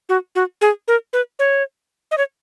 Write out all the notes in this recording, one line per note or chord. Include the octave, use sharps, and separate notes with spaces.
F#4
F#4
G#4
A#4
B4
C#5
D#5
C#5